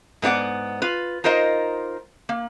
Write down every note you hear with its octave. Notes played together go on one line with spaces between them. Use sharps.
G#2 B3 D#4 D5 F#5
F4 B4
D#4 F4 A#4 C5 D#5
A#3